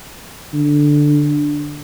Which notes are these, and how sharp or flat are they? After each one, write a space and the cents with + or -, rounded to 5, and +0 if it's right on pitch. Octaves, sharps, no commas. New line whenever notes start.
D3 +0